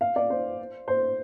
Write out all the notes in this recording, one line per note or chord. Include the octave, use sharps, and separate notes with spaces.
F5
D5
C5
C5